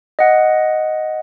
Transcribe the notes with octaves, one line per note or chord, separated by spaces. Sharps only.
D#5 F#5